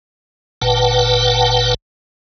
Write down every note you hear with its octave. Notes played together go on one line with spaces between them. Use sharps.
G1 A#2 B4 F#5 G5 A5